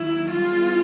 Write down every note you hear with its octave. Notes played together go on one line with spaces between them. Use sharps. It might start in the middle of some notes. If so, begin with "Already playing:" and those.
Already playing: D#2 D#3 F#3 E4
G3 B3 E4 F4 G#4